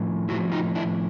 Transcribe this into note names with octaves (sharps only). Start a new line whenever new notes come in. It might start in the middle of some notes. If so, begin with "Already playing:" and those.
Already playing: A2 F3
A2 F3 E4 F#4
D#4 F4
D4 E4